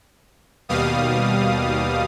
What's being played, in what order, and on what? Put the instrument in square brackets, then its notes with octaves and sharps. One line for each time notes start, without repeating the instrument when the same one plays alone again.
[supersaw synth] D#2 B2 G3 F5 D#6